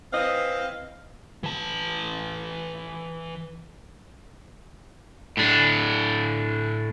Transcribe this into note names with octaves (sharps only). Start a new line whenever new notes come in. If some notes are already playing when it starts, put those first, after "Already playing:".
E3 C4 D#5 F5
E3 A5
A2 D4